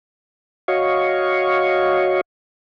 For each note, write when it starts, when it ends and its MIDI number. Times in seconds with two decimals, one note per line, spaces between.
0.68 2.21 66
0.68 2.21 73
0.68 2.21 75
0.68 2.21 77
0.68 2.21 85